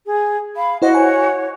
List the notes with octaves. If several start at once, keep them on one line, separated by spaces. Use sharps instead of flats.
G#4
F5 B5
E4 F#4 C5 D#5 F#5
C#5 G#5